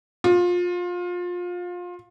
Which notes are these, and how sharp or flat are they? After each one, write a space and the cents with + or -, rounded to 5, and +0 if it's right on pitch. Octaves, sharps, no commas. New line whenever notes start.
F4 +25